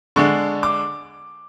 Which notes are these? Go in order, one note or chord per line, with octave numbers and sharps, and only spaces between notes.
D3 G#3 D4 C#6
D6